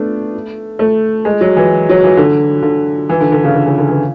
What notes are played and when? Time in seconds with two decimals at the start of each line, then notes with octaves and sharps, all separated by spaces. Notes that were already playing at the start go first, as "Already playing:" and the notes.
Already playing: A3 B3 D4
0.79 A3
1.25 G#3
1.41 F#3
1.57 E3
1.89 F#3
2.04 E3
2.17 D3
2.62 D3
3.09 E3
3.20 D3
3.32 D3
3.44 C#3
3.54 D3
3.66 C#3
3.78 D3
3.89 E3